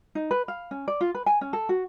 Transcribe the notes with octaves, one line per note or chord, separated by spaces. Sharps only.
D#4
B4
F5
C#4
D5
F4
B4
G#5
C#4
A4
F#4